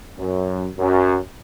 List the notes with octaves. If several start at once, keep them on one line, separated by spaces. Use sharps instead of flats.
F#2
F#2